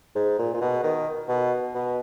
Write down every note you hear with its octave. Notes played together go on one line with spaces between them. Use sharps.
G#2
A#2
A#2
B2
D#3
B2
B2